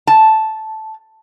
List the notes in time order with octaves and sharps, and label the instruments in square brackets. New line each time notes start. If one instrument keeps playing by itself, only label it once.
[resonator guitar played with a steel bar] A5